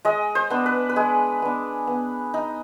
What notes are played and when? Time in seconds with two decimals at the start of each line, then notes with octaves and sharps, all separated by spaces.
0.05 G#3 D#5
0.35 C5
0.50 B3 D4
0.66 B4
0.89 B4
0.96 G#3 G#4
1.42 B3 D4
1.87 B3
2.34 D#4